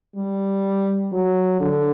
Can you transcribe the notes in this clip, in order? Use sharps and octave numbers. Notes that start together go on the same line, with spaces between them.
G3
F#3
D3